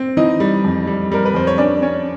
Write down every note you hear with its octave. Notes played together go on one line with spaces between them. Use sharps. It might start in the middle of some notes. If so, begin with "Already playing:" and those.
Already playing: C4
E3 D#4 D#5
G3
F2
G3
G3 A#4
B4
F2 C5
C#5
C#4 D4 D5
C#4 C#5